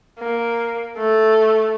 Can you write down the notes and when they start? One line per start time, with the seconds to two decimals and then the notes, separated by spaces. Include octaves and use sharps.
0.19 A#3
0.98 A3